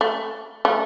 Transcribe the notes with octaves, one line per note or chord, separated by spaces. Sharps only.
A3
A3